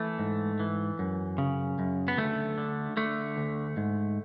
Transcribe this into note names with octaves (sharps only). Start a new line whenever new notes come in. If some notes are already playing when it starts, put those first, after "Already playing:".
Already playing: E3 A3
G#2
E3
F#2
C#3
F#2
B3
D2 A3
D3
D3 A3
D2
G#2